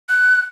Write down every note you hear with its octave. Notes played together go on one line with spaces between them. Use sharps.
F#6